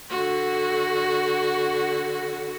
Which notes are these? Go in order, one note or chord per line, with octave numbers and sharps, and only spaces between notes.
D3 F#4